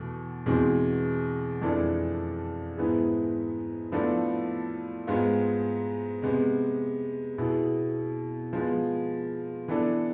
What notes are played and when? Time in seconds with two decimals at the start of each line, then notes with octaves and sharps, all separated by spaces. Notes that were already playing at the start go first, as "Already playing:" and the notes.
Already playing: E2 B2 A3
0.46 E2 B2 G#3 C4
1.61 F2 E3 G#3 D4 A4
2.77 G#2 E3 B3 E4 G#4
3.92 A2 F3 B3 D4 A4
5.07 G#2 G#3 B3 F4
6.22 C3 G#3 B3
7.38 B2 B3 E4 G#4
8.53 F3 G#3 B3
9.68 E3 B3 D4 A4